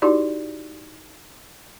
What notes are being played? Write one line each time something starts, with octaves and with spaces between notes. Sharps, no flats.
D#4 E4 F#4 G4 D5